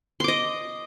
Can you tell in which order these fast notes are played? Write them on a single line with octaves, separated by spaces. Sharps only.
C6 D6 D#5